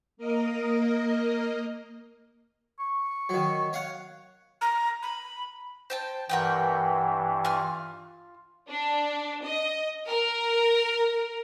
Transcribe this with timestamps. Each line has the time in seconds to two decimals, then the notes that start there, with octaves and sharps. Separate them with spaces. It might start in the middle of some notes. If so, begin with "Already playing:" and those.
0.17 A#3 A#4 D#5
2.79 C#6
3.29 D#3 F#3
3.73 C#5 F5 F#5
4.61 A#5
5.02 B5
5.90 C5 G5 A5
6.29 G2 E3 A#4 F#5 G5
7.45 F4 F6
8.68 D4
9.45 D#5
10.07 A#4